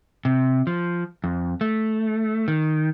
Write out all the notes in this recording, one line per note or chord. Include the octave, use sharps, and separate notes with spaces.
C3
F3
F2
A3
D#3